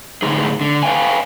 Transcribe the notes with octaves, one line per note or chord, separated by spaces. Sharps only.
A2 D3 G#3 B3 D#4 G#4
D3
B4 F5 G5 G#5